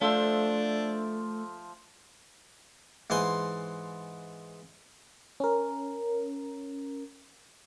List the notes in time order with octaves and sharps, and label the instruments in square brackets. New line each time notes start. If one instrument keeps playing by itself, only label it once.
[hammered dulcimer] F3 C5 E5 [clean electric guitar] A3 [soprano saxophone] D4
[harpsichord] G#2 E3 C5 G#5 C6
[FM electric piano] C#4 A#4